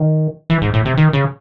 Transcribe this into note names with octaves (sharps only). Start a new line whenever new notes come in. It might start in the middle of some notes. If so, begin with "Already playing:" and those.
Already playing: D#3
E3
G#2
A2
C3
D#3
C#3